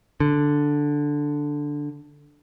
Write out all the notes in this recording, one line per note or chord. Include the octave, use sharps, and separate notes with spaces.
D3